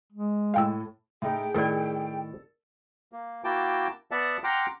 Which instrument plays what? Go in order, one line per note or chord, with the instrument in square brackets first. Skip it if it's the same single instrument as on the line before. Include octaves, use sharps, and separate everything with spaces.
[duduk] G#3
[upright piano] A2 A3 [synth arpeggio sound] F5 G5 E6
[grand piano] A2 A3 D#4 [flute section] G#4 G5
[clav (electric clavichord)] A2 D#3 [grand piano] A4 [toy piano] A#4 D5
[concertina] A#3
A#3 E4 F#4 G5 A5 D6
B3 D5 E5 F#5 A5
F#5 G5 A#5 C6 D6 F6